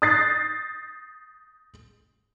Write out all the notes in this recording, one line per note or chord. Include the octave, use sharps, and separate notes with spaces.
D#6 F#6 G6 A6 A#6 C7